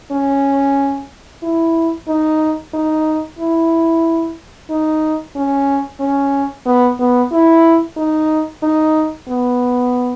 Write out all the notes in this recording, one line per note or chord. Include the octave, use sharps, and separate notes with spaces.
C#4
E4
D#4
D#4
E4
D#4
C#4
C#4
B3
B3
E4
D#4
D#4
B3